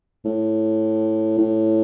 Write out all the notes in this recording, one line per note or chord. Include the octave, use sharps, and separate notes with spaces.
A2
A2